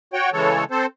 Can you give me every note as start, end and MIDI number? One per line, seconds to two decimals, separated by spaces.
0.13 0.30 66
0.13 0.30 73
0.13 0.30 79
0.33 0.64 49
0.33 0.64 52
0.33 0.64 56
0.33 0.64 69
0.33 0.64 73
0.71 0.86 60
0.71 0.86 69
0.71 0.86 72